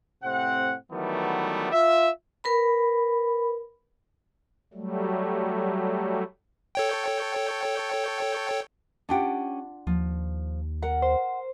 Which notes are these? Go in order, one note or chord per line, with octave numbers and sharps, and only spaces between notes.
A2 C3 C4 F#5
D#3 E3 F#3 G3 A3 B3
F4 E5
A#4 B4 B5
F#3 G3 A3
A4 C#5 G5
C#4 D4 F4 G4 F#5 G5
D#2 F3
A#4 F#5
C5